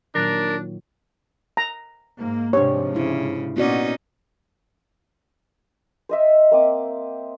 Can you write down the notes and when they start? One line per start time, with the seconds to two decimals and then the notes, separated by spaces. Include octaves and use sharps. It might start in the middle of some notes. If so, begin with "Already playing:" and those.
0.15 A#2 D#3 F#3 D4 A#4
1.57 A#5
2.19 G#2 A#3
2.53 G#2 C3 F3 D4 G4 C#5
2.96 C#3 E4
3.57 A#2 B3 C#4 D#4 F#4 D5
6.09 C5 D#5 E5
6.51 A#3 C4 D6 D#6